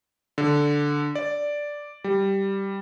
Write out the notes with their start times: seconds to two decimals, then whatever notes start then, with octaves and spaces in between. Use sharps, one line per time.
0.38 D3
1.15 D5
2.04 G3